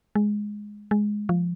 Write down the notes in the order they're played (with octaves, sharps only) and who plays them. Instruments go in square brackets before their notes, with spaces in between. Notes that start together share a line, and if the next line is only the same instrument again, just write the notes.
[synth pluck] G#3
G#3
F3